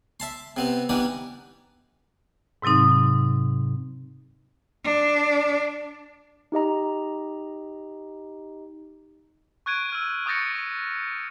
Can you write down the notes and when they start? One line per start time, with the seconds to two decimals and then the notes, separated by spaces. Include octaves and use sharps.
0.20 E5 A5 C6
0.57 C3 B3 C4
0.89 E3 G3 B3 D4 D#4
2.62 G#2 C3 F#3 C4 D#4
4.84 D4
6.52 D#4 G4 D#5 A#5
9.66 C#6 F#6 G#6 D7 D#7
9.90 E6 F6 G#6
10.26 C#6 D#6 G6 A6 A#6 C#7